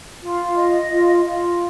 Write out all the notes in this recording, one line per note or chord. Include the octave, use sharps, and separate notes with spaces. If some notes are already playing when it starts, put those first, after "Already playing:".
F4
D#5
F4
F4